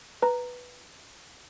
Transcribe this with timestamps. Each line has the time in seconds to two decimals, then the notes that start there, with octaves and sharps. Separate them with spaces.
0.22 B4 A#5